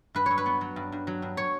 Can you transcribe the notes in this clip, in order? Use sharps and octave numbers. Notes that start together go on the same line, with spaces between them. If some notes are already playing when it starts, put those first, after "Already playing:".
G2 B4
F#3 C#5
B4
B3
F#3
G2
G2
F#3
G2
C#5